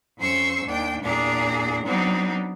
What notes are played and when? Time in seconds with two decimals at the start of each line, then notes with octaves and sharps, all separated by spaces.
0.19 F2 C#4 C5 C6 C#6 E6
0.65 D#2 D4 G5
1.02 E2 A#2 D4 G4 G#4 A#5
1.86 F#3 B3 C4 D4 D#4